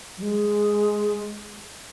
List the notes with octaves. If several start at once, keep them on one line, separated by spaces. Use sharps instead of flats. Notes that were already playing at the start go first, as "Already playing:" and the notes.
F#3
G#3